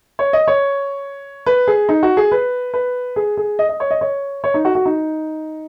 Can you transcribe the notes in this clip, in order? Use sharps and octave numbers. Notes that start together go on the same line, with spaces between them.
C#5
D#5
C#5
B4
G#4
D#4
F#4
G#4
B4
B4
G#4
G#4
D#5
D#5
C#5
D#5
C#5
C#5
D#4
F#4
F#4
D#4